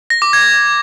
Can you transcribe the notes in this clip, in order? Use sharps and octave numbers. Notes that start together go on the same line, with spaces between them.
A#6
D6
G#6